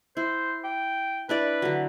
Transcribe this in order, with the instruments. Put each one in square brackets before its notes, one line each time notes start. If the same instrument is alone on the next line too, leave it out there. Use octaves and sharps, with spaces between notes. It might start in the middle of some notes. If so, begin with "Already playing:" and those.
[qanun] E4 [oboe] C5
[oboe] G5
[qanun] D4 E4 D5 [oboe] B4
[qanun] D3 F#3